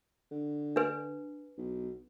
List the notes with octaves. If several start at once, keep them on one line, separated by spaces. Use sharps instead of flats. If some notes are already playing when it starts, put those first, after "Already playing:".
D3
D4 B4
B1